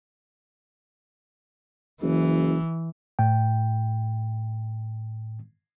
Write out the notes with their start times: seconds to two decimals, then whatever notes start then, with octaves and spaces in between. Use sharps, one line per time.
2.02 F#1 E3
3.19 A2 G5